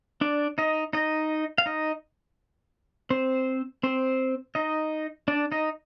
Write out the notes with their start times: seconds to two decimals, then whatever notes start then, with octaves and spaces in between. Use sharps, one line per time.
0.21 D4 D5
0.58 D#4 D#5
0.93 D#4 D#5
1.58 F5
1.66 D#4 D#5
3.10 C4 C5
3.83 C4 C5
4.55 D#4 D#5
5.28 D4 D5
5.52 D#4 D#5